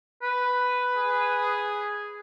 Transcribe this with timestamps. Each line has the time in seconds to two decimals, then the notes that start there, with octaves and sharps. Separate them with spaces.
0.22 B4
0.95 G#4